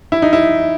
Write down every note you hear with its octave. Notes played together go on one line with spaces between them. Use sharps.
E4
D#4
E4